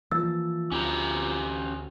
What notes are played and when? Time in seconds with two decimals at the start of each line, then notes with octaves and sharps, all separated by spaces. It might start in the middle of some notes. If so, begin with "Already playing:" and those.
0.12 E3 F3 A#3 F4 E6 A6
0.72 D2 C#4 G4 A#5